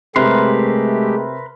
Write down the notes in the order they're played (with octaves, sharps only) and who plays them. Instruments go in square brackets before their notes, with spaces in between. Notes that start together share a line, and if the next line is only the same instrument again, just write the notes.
[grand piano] C3 [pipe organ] G#3 A3 G4 [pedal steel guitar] A#4 B4 C6